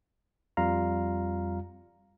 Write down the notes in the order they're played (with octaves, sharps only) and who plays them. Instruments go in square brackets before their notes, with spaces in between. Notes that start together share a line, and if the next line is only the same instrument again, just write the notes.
[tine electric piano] F2 G3 F4 F5 A#5